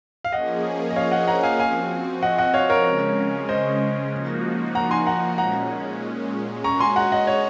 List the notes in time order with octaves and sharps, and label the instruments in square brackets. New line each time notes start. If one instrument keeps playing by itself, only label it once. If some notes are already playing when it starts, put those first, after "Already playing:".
[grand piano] F5
[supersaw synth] F3 A#3 C#4 G#4 [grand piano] D#5 F#5
[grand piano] D#5
C#5 F5
D#5 F#5
F#5 A#5
F5 G#5
[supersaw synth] F3 C4 F#4 [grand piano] F5 G#5
[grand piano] D#5 F#5
D#5 F#5
C#5 F5
A#4 C#5
[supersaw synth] C#3 G#3 C#4
[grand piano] C5 D#5
[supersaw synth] F3 A#3 D#4 F#4
[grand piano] F#5 A#5
G#5 C6
F#5 A#5
[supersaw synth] A#2 G#3 C#4 [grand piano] F#5 A#5
[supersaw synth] G#3 C#4 F#4 [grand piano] A#5 C#6
[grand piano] G#5 C6
F#5 A#5
D#5 F#5
C#5